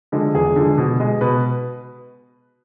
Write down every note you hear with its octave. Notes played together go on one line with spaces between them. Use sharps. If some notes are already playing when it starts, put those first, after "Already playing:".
D3 F3 G#3
E2 G#4
D3 F3 G#3
B2
G#3
B2 B4